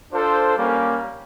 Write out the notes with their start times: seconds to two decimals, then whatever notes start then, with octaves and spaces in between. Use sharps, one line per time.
0.11 D4 F4 A4 C5
0.55 G3 A#3 C#4